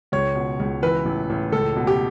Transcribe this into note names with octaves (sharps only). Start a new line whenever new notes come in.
C#2 C#5
B2
C#2
E3 B4
A1
A1
C#2 A4
B2
G4